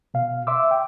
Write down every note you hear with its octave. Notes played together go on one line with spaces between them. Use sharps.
B2 F5
E5 C6 D6 E6
G5